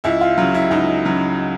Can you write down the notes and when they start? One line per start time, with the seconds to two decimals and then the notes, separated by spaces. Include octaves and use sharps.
0.04 C#2 E4
0.21 F4
0.38 C#3 F#3 F4
0.54 E4
0.71 C#2 D#4
1.05 C#3 F#3